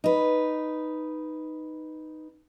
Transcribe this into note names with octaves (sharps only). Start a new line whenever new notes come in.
D#4 B4